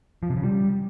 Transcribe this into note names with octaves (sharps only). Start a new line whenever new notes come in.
F3
C3
C#3
G3